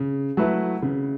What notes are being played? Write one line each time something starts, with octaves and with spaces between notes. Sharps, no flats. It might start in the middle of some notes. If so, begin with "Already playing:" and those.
Already playing: C#3
F#3 A3 E4 B4
C#3